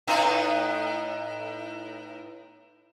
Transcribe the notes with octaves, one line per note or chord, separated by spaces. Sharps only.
A2 B3 D#4